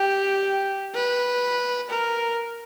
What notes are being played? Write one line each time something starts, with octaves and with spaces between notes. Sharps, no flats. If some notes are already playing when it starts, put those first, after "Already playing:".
Already playing: G4
B4
A#4